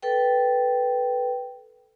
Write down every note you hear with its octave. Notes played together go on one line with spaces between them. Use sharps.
A4 B4 G5